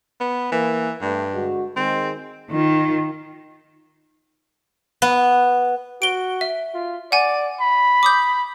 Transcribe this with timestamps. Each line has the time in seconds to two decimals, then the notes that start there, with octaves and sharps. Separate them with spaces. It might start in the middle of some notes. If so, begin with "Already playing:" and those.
0.20 B3
0.52 E3 A#3
1.01 G2 G3 A3
1.34 D3 G#3 F#4
1.76 D#3 G#3 C4
2.51 D#3 F4
5.02 B3
6.02 F#4 D7 G7
6.41 E5
6.74 F4
7.12 D5 F#5 G#5
7.61 B5
8.03 D6 D#6 G6